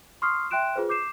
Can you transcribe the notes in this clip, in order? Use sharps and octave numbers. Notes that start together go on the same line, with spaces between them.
C6 C#6 D#6 F6 C7
E5 G5 C6 F#6 D7 E7
F4 G#4 B4 C5
D6 G6 C7 E7